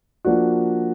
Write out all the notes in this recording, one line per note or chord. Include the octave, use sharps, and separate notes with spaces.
F3 A#3 D4 F#4